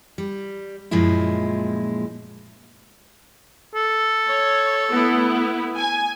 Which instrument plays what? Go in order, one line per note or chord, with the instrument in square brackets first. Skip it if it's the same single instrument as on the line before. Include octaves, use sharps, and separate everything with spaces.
[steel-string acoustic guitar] G3
F#2 A#2 F3 G#3 E4
[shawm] A4
[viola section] C#5
A3 B3 E4
G#5